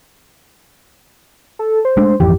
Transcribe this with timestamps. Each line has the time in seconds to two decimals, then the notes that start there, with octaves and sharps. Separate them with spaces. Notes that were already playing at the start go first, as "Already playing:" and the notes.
1.59 A4
1.85 C5
1.97 G#3 A3 D4
2.20 G#1 F2 E3 G4